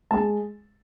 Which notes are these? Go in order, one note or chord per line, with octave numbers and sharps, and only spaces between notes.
G#3 A5